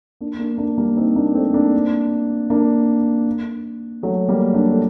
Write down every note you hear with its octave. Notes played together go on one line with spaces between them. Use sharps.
A#3 D4
A#3 D4
A#3 D4
G3 A#3
C4 D#4
A#3 D4
A3 C4
A#3 D4
A#3 D4
F#3 A3
G3 A#3
A#3 D4
A3